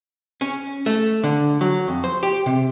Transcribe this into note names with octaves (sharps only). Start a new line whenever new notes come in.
C#4
A3
D3
F#3
F2
C5
G4
C3